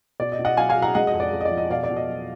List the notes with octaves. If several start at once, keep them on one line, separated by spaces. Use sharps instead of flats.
B2 D5
D#5
B2
D#5 F#5
F#3 F5 G#5
F5 G#5
F#3
F#5 A#5
G#3 D#5 F#5
D#5
F2
D5
F2
D#5
D5
F3
D#5
B2 D5 F5
D5
B2
D#5
F#3